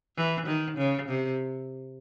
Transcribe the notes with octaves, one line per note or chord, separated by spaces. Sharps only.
E3
D#3
C#3
C3